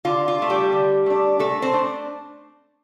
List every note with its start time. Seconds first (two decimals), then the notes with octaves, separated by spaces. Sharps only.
0.05 D3 F4
0.28 F4
0.38 A3 D4
0.50 G3 G4
0.72 D3
1.06 A3 D4
1.39 A#2 A3 A4
1.62 C4 C5
1.73 A3 D4